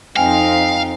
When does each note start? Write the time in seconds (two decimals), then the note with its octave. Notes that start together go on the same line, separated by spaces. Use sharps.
0.16 F2 C4 D#4 F5 G5 G#5